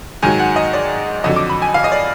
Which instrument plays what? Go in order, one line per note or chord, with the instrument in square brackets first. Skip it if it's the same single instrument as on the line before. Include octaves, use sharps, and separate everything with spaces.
[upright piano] G#2 D#3 F#3 G#5
F#5
D#5
D5
F2 D3 F#3 D#5
D6
B5
G#5
F5
D#5
D5